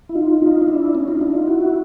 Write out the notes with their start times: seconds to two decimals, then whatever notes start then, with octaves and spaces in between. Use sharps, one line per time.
0.09 E4
0.15 D#4 F4
0.42 D#4 F4
0.61 D#4
0.68 D4 E4
0.95 C#4 D#4
1.08 D#4 F4
1.21 D4 E4
1.34 D#4 F4
1.48 E4 F#4